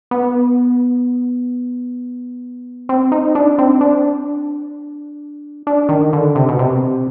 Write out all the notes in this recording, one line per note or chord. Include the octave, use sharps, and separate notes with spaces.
B3
C4
D#4
D4
C4
D4
D4
D#3
D3
C3
B2
C3